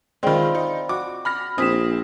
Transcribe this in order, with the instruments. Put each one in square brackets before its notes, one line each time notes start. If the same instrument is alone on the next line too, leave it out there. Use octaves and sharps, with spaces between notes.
[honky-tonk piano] D#3 G#3 [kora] C4 F4 [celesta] D5 B5
[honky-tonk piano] D#4
[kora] F#4 [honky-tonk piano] D6
[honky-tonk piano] B5 F6 A#6
[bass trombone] A#1 [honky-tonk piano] C4 [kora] G#4 [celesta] D#6 B6 E7